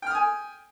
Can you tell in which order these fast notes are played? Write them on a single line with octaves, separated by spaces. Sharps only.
G5 F6 D#6 G#5